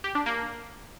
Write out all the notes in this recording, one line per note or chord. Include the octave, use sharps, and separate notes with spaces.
G4
D4
A#3